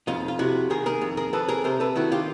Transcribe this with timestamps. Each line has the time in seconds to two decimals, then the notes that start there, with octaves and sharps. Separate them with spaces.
0.07 F2 D#4 F4
0.28 F4
0.39 C3 E4 F#4
0.70 D#3 G#4 A#4
0.86 G#4 A#4
1.01 F2
1.17 G#4 A#4
1.33 F2 A4 B4
1.48 G#4 A#4
1.64 C3 A#4 C5
1.80 A4 B4
1.96 D#3 E4 F#4
2.12 F4 G4